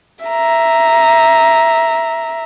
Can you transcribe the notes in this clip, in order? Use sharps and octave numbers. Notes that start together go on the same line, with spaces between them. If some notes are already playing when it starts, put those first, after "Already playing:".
E5 A#5